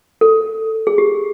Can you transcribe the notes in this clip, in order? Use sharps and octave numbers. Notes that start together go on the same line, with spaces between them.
A4
G#4
G4